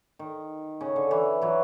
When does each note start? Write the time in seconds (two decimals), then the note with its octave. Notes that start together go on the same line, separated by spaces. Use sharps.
0.19 D#3
0.81 C#3
0.96 D3
1.11 E3
1.42 E3 F#3